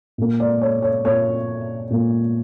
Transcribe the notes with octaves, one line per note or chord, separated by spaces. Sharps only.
A#2 A#3
D5
C#5
C#5
A#2 A#3 C#5
A#2 A#3